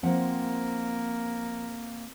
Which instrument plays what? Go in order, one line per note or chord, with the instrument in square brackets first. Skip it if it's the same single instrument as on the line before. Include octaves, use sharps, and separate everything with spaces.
[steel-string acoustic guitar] F3 F#5 [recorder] A#3 [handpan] C4